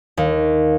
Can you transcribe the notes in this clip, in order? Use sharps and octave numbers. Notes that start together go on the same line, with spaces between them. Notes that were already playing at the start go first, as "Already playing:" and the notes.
D#2